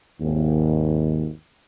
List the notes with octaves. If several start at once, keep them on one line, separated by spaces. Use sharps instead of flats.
G#1 D#2